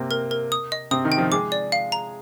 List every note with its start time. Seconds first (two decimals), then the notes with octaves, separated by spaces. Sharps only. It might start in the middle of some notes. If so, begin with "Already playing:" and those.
Already playing: C3 A#3 C4
0.11 A#4
0.31 A#4
0.52 D#6
0.72 D#5
0.91 C3 C4 D#6
1.05 D#3 D#4
1.12 G5
1.18 F3 F4
1.32 G#3 G#4 D6
1.52 D5
1.72 F5
1.92 A#5